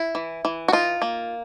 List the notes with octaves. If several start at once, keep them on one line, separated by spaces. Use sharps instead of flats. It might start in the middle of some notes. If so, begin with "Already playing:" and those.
Already playing: E4
E3
E3
F#4
D#4 F4
A#3